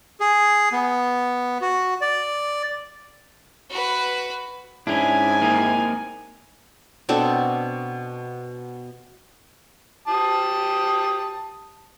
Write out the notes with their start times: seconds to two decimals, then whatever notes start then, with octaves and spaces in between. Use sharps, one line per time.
0.20 G#4
0.72 B3
1.61 F#4
2.01 D5
3.70 F#4 B4
4.87 G#2 C#4 D4 E4 G#5
5.41 A#3 C4 D#4
7.09 B2 C4 D4 A4
10.08 G4 A5 D#6